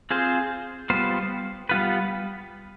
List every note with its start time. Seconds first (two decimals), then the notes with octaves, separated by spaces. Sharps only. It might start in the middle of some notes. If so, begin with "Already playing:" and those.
0.10 C4 F4 G#4 C5
0.90 G3 B3 F4 C5
1.69 G3 B3 F4 B4